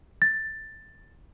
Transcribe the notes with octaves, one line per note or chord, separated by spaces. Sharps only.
A6